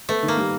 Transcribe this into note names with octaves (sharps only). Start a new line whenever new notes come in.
A3 B3
D#3
A#3
G3